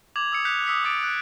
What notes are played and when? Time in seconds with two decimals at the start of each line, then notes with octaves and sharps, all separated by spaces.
0.16 D6 G#6 F7 F#7
0.32 D#6 E6 C#7
0.45 F#6 G6 B6 C#7 F7
0.67 D#6 E6 B6 C#7
0.84 D6 A6 D7
1.04 F#6